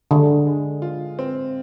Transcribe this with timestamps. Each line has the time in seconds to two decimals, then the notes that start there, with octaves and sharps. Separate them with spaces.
0.11 D3 G#3
0.47 G#3
0.82 F4
1.19 C4